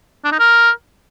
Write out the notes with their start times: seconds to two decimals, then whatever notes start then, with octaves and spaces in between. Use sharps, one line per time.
0.24 D4
0.32 D#4
0.39 A#4